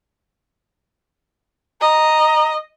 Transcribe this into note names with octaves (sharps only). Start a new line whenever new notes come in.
D#5 A#5